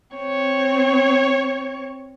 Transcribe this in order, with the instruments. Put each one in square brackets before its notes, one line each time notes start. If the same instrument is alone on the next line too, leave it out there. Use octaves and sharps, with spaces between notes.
[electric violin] C4 C#5